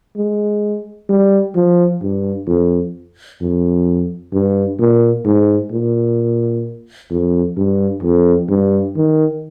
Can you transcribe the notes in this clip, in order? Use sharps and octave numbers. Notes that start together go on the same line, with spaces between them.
G#3
G3
F3
G2
F2
F2
G2
A#2
G#2
A#2
F2
G2
F2
G2
D#3